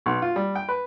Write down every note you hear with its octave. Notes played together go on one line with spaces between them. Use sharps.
B1
F4
G3
G5
B4